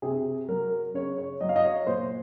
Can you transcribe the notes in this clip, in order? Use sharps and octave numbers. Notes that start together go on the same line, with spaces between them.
C3 G#4
F#3 A#4
C#3 C#5
C#5
F#3 D#5
F5
D#5
C#5
A#2 C5